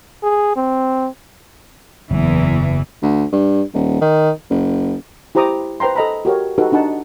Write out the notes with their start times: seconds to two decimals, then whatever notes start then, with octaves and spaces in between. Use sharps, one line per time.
0.23 G#4
0.56 C4
2.10 F#1 E2 E3
3.02 D2
3.32 G2
3.74 D#1
4.01 D#3
4.50 F#1
5.35 E4 G4 C5 A#5 D6 D#6
5.80 B4 C5 G5 A#5 C6
5.95 A4 D#5 A#5 B5
6.25 F#4 G4 A#4 C#5
6.58 D#4 F#4 G4 A4 B4
6.72 D4 D#4 F#5 A5